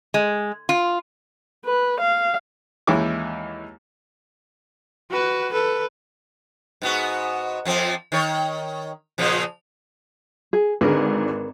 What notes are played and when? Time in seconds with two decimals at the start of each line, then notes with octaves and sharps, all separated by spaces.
0.14 G#3
0.69 F4
1.65 B4
2.00 F5
2.87 D#2 E3 G#3 C#4 E4 D6
5.11 F#4 B4
5.52 A4 B4
6.82 G#2 B3 F#4
7.65 F2 F3 C4
8.12 D#3 C#5
9.18 A#2 C#3 F3
10.53 G#4
10.81 G#1 G#2 D3 G#4 A#4 B4